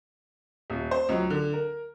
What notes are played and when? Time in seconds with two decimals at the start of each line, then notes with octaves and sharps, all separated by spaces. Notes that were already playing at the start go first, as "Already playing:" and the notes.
0.70 D#1
0.91 C5
1.09 C#2 F#3
1.30 D3
1.53 A#4